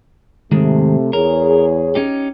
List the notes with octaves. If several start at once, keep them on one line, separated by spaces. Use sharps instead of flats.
G#2 C3 D#3 G#3 A3
E2 G#4 A#4 C#5
C#4 D#4 G4